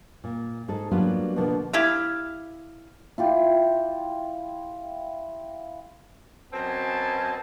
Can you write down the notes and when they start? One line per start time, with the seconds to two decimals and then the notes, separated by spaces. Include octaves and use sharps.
0.24 A#2
0.68 G#2 A4
0.91 F#3 G3 A#3 B3 D4 F4
1.36 B2 D3 F3 A#3 B3
1.73 E4 G4 F5
3.18 E4 F4 G4
6.53 F#2 B2 B3 C4 G#5 A5